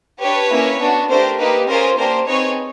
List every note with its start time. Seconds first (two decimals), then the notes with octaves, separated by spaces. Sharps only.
0.21 D4 G4 B4 C#5
0.50 A#3 C#4 E4
0.80 B3 D4 F#4
1.10 A3 D4 G4 A#4 C5
1.39 A#3 D#4 G4 B4
1.68 C#4 F4 G#4 A#4 C5
1.98 A#3 D4 G4 A#4 C5
2.27 C4 D#4 G#4 B4 C#5